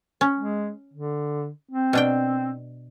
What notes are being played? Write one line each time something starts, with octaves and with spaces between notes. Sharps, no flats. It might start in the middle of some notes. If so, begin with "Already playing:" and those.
C#4
G#3
D3
C4
B2 D4 G5